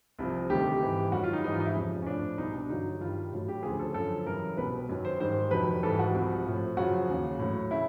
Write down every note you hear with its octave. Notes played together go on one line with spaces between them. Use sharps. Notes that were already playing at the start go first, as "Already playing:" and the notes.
C2 C3 F3
D2 C3 D#3 G3 G4
G#2 E3 G3
F#2 D#3 G3 F#4
F4
D#4
G#2 E3 G3 D#4
F4
D#4
E4
F2 C#3 F3
C#4
A2 F3 D4
C2 B2 G3 D#4
D4
G2 D3 F#3 D#4
G2 D#3 G3 F4
A2 F#3
G4
D2 C#3 F3 G#4
A4
F#2 D3 F3 A4
F#2 C#3 E3 G3 A#4
C2 B2 G3 B4
F#2 D#3 F#3
C5
G#2 D#3 G3 C5
F2 C3 D#3 F#3 B4
G#2 E3 G3 A4
F#4
C2 C3 F3
A2 F3
F#2 C#3 F3 F#4
D#2 C#3 F#3
A2 F#3
C#3 E4